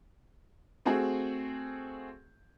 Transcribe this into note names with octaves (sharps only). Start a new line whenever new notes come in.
A3 C4 F#4 G#4